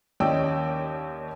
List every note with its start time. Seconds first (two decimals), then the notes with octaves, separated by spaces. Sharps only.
0.20 D#2 C#4 D5 D#5 G5 E6